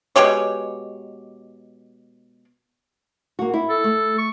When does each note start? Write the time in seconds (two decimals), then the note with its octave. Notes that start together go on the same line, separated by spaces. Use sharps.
0.16 B2 G#3 G4 C#5
3.39 A#3 F#4
3.54 E4
3.69 A4
3.84 A3
4.18 C#6